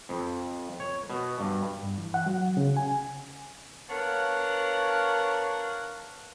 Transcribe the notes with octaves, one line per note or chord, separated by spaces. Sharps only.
F2
C#5
B2
G2
G2
E3
F#5
F#3
C#3
G#5
B3 D4 A#4 C#5 F5 F#5